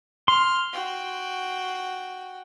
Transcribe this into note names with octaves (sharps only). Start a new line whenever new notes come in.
C6 F6
F#4 G5